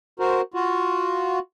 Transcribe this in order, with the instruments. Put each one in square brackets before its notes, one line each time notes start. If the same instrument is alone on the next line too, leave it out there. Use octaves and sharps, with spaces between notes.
[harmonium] F#4 A#4 C5
F4 F#4